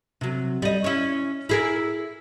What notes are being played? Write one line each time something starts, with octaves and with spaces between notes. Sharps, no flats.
C3 F#3
G3 D#5
C#4 E4
E4 G#4 A#4